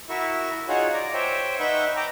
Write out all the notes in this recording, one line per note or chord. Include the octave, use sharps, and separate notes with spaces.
E4 F#4 A#4 E5 C#6
D#4 F4 F#4 G#4 C#5 F#5
D5 A#5
C5 C#5 E5 G5
D#4 B4 E5 F#5 C#6 G6
G5 A#5 D6 G6